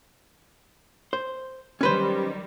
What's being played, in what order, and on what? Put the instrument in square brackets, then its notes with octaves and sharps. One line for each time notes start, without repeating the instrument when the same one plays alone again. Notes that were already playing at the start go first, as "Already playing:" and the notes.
[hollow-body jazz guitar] C5
[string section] D#3 F#3 G3 [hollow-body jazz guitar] C#4 B4 C5